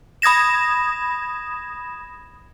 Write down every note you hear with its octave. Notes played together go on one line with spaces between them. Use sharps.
B5 D#6 G#6 A#6 E7